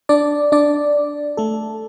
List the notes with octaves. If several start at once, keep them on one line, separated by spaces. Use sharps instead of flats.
D4 D5
D4 D5
A3 A4